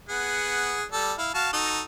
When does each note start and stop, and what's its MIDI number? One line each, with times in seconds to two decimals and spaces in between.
0.09 0.84 59
0.09 0.84 68
0.09 0.84 78
0.92 1.13 55
0.92 1.13 69
1.18 1.31 64
1.18 1.31 77
1.34 1.53 66
1.34 1.53 77
1.34 1.53 81
1.53 1.81 63
1.53 1.81 66
1.53 1.81 69